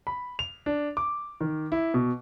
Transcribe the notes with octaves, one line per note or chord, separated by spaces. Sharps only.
B5
F7
D4
D6
D#3
E4
B2